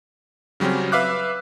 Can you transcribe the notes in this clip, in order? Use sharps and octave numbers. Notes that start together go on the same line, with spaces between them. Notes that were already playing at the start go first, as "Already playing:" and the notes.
C#3 F#3 G3 C4 C#4
B4 E5 F5 D6 F#6